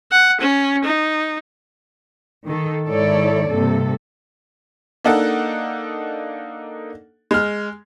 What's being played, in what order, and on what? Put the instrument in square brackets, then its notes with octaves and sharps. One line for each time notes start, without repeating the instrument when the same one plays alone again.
[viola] F#5
C#4
D#4
[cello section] D#3 A4
G#2 D#3 E4 A4 C#5 D5
G2 C3 A#3 A4
[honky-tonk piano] A#3 D4 D#4 A4 F#5
G#3 F6